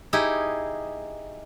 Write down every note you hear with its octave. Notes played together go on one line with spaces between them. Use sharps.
D#4 E4 G4 G#4